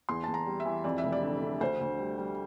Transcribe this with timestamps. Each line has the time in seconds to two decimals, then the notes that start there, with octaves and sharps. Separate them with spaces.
0.09 E2 C6
0.24 E2 A5
0.34 A#5
0.46 G3
0.60 E5
0.65 E3
0.84 F2 D5
0.98 E5
1.04 F1
1.12 D5
1.22 D3
1.42 D3
1.60 D2 C5
1.81 D2
1.99 G3
2.18 G3